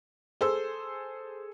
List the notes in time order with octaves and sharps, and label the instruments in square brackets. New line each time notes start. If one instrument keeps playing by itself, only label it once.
[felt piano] G#4 A4 E6 [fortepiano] C5